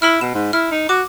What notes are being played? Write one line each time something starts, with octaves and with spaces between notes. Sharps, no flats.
E4 B5 E6 F6
B2 E7
G#2
E4 F6
D#4
F#4 D6